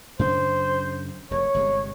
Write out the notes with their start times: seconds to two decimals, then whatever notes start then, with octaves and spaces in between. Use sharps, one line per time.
0.19 F#2 C#3 D4 C5
1.31 F1 F#2 C#5
1.54 G1 C3 G#3